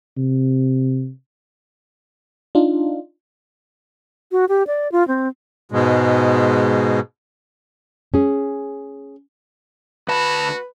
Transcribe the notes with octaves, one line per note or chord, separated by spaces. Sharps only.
C3
D4 D#4 F4
F#4
G4
D5
F4
C4
G#2 B2 G#3
C#4 G#4
D2 F#4 B4 A5 B5